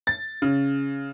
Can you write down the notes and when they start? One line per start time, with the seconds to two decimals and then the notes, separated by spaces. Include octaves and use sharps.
0.07 A6
0.42 C#3